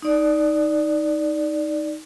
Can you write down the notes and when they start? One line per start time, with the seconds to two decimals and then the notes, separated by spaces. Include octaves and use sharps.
0.02 D#4 D5